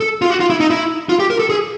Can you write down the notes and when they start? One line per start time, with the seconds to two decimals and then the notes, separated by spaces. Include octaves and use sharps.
0.01 A4
0.22 F4
0.30 F#4
0.40 F4
0.50 E4
0.60 D#4
0.70 E4
1.09 F4
1.20 G4
1.30 A#4
1.40 A4
1.50 G#4